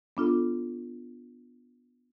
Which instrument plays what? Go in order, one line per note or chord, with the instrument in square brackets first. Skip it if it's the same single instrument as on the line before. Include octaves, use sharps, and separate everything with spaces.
[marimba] B3 D4 F4 A4